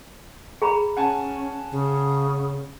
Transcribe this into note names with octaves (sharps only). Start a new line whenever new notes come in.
G#4 A#5 B5
C#4 F#5 G#5 A5
C#3